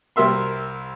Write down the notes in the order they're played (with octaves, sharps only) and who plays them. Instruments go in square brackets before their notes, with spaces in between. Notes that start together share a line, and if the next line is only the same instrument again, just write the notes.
[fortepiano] C2 G3 A#4 E5 C6